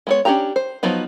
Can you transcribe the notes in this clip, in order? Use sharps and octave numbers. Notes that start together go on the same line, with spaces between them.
G#3 B3 C#5
C#4 D4 G4 G5 A#5
C5
F3 F#3 B3 D#4